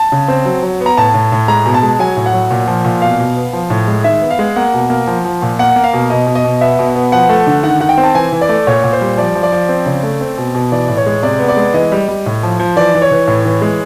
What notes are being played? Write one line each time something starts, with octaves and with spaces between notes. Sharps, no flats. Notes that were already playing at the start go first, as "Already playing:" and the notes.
Already playing: A5
C#3
C4
F#3
F#3
B3
A#5
A2 A5
A2
A2
G#3 A#5
B2
A5
G#3
F#3 G#5
A2
F#5
F#3
A#2
F3
A#2
B2 F5
B2
B3
F3
A2
G#3
D#3 E5
B3
F5
G#3
A#3 F#5
B2
A#3
F3
F3
A#2
A#3 F#5
A#3
F5
B2
B2 D#5
B2
D#5
B2
B3 E5
B2
B3
F3 F#5
A3
D3
D#3 F#5
D#3 F#5
G5
C4
A5
E3 G#5
E3
D5
A3
A#2 C#5
A#2
C5
G3
F3 D5
F3
D5
F3
C4
C#3
A3
C4
B2
B2
E3 D5
A2
C#5
G#3
C3 D5
B3
D5
G#3
E3 D#5
G3
G3
A2
F3
F3
E3 D5
E3
C#5
E3
A2
E3
G#3